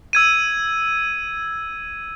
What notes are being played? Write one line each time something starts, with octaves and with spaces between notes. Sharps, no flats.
E6 G#6 D#7